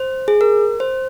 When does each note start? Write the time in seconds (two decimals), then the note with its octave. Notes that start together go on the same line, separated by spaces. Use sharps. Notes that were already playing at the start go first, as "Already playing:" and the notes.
Already playing: C5
0.28 G#4
0.41 A#4
0.80 C5